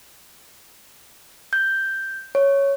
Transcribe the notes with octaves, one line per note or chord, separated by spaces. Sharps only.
G6
C#5